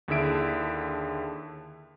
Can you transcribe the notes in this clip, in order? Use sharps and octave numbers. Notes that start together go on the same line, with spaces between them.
D#2 D3 E4 G#4 E5 D7